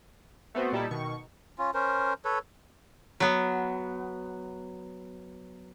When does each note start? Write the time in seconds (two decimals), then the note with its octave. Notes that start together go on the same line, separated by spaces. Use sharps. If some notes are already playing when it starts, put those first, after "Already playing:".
0.55 A3 B3 C4 F#4
0.72 A#2 G3 D#4 E4 A4
0.91 B2 D#3 C#6
1.58 C#4 F4
1.74 C#4 A#4 C5
2.25 A4 B4 C#5
3.20 F#3 B3